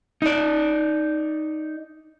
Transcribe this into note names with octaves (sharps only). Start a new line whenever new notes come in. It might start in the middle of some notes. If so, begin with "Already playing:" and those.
D#4 D5